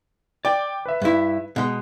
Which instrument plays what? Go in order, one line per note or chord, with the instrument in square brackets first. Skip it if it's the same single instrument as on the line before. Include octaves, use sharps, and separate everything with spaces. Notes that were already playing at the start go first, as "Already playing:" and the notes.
[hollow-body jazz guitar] D5 [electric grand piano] G5 D6
[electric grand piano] B4 E5
[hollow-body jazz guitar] G2 E4
B2 G#3